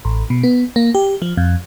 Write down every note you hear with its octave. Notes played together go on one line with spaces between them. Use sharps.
A1
B2
B3
A#3
G4
F3
F2